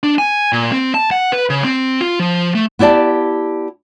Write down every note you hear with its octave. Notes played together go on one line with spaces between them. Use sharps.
D4
G#5
A#2
C4
A5
F#5
B4
C#3
C4
F4
F3
A3
B3 E4 G4 D5 A5